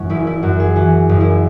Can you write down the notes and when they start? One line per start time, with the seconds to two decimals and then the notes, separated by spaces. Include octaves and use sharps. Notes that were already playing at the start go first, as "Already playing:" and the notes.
Already playing: F#2 E3 C#4
0.10 F#1 E4
0.27 E4
0.43 F#2 F#4
0.60 G#4
0.76 E3 F#4
1.09 F#1
1.20 E4